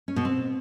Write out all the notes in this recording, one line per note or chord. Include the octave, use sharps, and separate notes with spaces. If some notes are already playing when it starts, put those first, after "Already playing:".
C#4
B2
C4